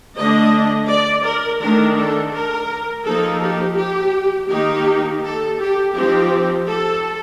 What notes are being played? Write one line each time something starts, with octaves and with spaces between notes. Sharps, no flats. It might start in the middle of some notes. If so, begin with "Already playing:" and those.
D3 A3 D4 D#5
D5
A#4
D#3 A3 D4 A#4
A4
A#4
F3 A#3 D#4 A4
G4
G4
D#3 A#3 D#4 G4
A4
G4
F3 C4 D#4 G4
A4